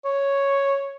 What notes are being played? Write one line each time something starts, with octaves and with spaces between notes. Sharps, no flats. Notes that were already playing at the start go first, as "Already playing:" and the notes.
C#5